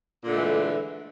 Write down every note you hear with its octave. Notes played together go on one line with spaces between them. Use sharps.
A#2 D3 E3 G#3 A3